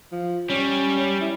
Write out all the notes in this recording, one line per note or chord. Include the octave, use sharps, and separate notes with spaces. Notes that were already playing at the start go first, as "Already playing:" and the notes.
F3
G3 C#4
E4